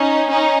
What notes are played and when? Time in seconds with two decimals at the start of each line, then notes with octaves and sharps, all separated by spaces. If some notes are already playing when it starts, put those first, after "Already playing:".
Already playing: C#4 D#4
0.30 C#4 D#4